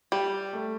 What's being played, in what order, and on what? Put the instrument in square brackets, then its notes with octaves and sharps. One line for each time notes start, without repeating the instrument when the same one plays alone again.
[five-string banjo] G3 [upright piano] G4
[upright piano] A3